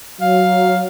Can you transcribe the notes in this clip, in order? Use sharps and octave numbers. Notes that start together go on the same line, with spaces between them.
F#3 F5